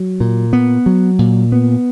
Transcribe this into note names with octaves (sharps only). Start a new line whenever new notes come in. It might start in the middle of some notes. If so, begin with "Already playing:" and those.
Already playing: F#3
A#2
B3
F#3
A#2
B3